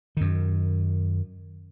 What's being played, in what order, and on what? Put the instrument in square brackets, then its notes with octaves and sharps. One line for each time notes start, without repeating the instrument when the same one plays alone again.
[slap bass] F#2 D#3